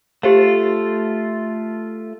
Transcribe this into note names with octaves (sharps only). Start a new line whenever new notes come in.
A3 F4 G4 C5 F5